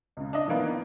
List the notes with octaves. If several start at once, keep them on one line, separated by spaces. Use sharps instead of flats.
C#2 C#3
D4 D#5
D#3 E3 A#3 B3 D4